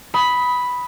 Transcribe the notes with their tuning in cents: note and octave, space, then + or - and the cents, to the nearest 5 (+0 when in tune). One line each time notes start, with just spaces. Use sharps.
B5 +0 D#6 +20